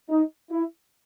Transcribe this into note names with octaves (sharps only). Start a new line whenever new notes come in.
D#4
E4